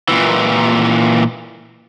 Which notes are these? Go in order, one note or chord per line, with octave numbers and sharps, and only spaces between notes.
A#2 E3